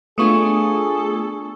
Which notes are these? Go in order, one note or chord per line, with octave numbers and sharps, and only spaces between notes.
A3 B3 D4 F4 G#4 A4 C#6 D#6